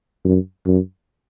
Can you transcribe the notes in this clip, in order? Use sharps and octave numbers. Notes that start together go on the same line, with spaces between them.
F#2
F#2